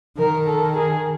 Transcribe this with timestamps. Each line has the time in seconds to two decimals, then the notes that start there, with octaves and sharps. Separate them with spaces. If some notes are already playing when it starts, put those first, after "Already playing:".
0.18 D#3 A#4
0.47 A4
0.76 G#4